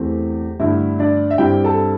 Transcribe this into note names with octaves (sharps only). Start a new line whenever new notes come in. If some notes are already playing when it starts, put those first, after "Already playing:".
Already playing: E2 E3 A3 C4 G4
G2 D3 A3 E4 E5
D4 D5
E5
G2 G3 C4 E4 G4 G5
A4 A5